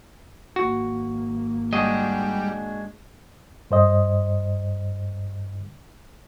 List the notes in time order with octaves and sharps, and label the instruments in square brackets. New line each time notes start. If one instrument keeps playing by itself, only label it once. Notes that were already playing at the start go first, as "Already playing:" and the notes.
[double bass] G#1 A#3 [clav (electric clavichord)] F#4
[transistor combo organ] G3 [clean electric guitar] G#3 D4 F#4 [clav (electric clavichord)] D#5
[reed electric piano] G2 C5 D#5